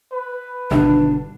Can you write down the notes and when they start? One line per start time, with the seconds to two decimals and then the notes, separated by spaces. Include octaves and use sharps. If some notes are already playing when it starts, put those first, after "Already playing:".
0.13 B4
0.71 G1 B2 D#3 D4